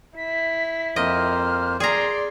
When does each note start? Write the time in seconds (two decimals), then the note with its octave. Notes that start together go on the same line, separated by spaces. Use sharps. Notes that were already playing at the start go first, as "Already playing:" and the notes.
0.17 E4 B6
0.96 F2 A#3 C5 D#5 F6
1.80 G#4 D5 A#5 C6